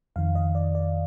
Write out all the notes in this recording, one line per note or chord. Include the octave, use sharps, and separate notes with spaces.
F2 D#3 F5
D#5
D5
D5